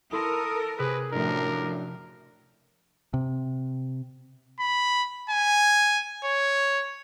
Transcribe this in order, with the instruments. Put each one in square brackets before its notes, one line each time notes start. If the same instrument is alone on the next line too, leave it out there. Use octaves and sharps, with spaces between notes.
[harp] E4 C6 [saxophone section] A4 [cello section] A#4 [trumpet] D#6
[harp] C3 E6 B6 [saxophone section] G#4 [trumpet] B4
[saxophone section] F#2 D4 [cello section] A2 F3 [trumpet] A#4
[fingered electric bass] C3
[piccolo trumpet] B5
G#5
C#5